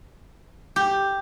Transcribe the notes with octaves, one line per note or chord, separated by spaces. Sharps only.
G4